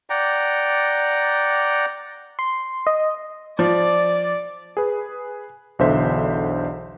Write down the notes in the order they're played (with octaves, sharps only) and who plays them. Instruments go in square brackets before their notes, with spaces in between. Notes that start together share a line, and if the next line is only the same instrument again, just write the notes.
[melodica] D5 F#5 G5 A#5
[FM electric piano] C6
D#5
[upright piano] F3 [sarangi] D5
[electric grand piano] G#4 B4
B1 E2 D3 C5 E5 B6